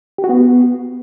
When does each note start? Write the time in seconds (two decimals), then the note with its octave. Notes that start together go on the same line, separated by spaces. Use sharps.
0.18 G4
0.24 F#4
0.29 B3